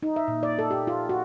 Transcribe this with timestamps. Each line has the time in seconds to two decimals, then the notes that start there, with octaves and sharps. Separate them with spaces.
0.03 D#4
0.16 E5
0.28 A#2
0.43 D5
0.59 A4
0.71 G4
0.87 F4
1.09 F#4